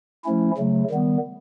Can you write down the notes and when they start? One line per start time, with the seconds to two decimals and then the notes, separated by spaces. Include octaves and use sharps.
0.25 F3 A3 C#4 E4
0.58 C#3 F#3 A3
0.91 D#3 G3 B3